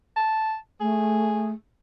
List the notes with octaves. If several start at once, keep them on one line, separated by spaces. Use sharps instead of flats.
A5
A3 G#4